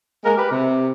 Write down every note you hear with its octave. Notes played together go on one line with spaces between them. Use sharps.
G#3 A#3 A#4
G4 A#4 B4
C3